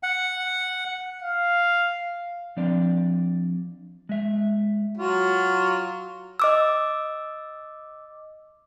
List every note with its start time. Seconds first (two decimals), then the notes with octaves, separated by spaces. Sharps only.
0.03 F#5
1.22 F5
2.57 F3 C4 D4 D5
4.09 G#3 E5
4.98 F#3 F4 F#4
6.40 D#5 D6 E6